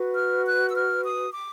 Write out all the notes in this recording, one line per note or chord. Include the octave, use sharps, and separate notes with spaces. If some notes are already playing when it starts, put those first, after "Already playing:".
Already playing: F#4 B4
F6
F#6
E6
F6
D#6
D6